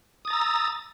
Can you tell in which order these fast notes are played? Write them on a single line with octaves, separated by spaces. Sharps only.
D#6 A6 A#5 E6